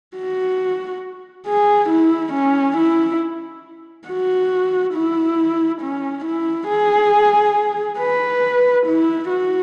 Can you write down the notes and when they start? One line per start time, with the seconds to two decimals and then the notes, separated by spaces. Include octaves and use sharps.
0.16 F#4
1.47 G#4
1.90 E4
2.33 C#4
2.77 E4
4.08 F#4
4.94 E4
5.82 C#4
6.25 E4
6.68 G#4
7.99 B4
8.87 E4
9.29 F#4